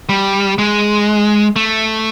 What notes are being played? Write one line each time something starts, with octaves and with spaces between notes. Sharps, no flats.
G3
G#3
A3